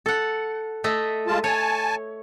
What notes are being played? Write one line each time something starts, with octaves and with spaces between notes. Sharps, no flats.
A4 F#5
A3 D#5 E5
G#3 F4 A5
C#5 G#5 A5